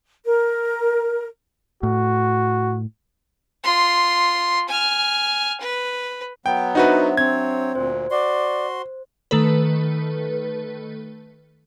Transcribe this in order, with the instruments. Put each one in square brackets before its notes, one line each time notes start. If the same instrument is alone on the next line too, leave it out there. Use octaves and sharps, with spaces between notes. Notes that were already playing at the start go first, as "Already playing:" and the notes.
[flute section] A#4
[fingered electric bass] A2 [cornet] F#4
[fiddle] F4 C6
G#5 F6
B4
[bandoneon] F#3 B3 [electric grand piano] G5
[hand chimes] D4 C5 E5 [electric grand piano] D#4 F#4 B4
[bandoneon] F#3 C#5 [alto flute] C4 [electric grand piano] G#6
[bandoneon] D2 A#2 [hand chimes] C5
[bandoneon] F#4 C6 [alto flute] D5
[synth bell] D#3 A3 A4 B4